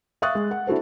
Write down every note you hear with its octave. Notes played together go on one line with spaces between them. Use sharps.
E5 F5 C#6 D#6 F#6 A6
G#3
F#5
D4 E4 F#4 A4 C5